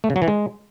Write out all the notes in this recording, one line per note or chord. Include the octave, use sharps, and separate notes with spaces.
A3
C#3
F#3
E3
G#3